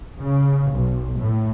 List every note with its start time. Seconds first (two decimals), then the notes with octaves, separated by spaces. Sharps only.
0.19 C#3
0.71 B1
1.19 A2